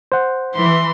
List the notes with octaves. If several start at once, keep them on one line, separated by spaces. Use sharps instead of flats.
C5 F#5
E3 C6